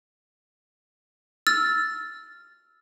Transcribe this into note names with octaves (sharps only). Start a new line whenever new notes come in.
E6 F6 A6